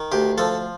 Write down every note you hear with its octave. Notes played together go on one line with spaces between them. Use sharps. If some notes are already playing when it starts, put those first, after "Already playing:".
Already playing: D#3
D2 G4
F3 A4